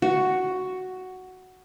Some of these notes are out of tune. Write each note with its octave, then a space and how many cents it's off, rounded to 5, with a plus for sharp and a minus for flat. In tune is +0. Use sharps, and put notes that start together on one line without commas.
F#4 +5